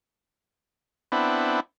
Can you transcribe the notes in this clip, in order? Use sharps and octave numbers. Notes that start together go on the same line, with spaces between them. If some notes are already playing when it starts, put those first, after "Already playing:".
B3 C4 D4 E4